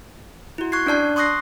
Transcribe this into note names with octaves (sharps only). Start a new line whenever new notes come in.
E4 F#4
C#6 F#6 G#6 C7
C#4 D4 D5 A5 F#6
C6 C#6 D#6 F#6 A#6 C7